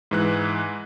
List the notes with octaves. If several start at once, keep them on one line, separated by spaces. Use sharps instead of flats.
G#2 E3 F#6